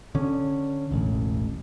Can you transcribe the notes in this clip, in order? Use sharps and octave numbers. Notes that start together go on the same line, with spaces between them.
D3 C#4
E1 A1